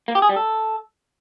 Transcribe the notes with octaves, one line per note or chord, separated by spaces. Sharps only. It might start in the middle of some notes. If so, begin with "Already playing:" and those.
A#3
G4
G#4
G3
A4